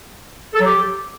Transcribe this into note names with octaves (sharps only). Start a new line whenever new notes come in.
A4
F#3
G4